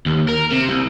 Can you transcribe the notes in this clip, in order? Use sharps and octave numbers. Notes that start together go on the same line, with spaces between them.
D#2
A#4
C3
C2